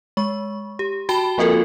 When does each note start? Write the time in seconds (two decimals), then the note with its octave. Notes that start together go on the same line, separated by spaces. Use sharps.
0.17 G#3 C#6
0.79 G4
1.09 F#4 G5 A5 B5 G7
1.38 F3 A#3 C4 F4 A4 A#4